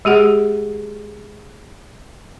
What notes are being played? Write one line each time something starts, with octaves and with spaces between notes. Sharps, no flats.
G#3 G4 G#4 F#5